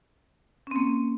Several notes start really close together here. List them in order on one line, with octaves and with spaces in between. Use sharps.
C#4 C4 A#3